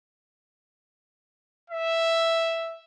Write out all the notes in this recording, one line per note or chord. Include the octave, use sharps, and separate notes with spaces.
E5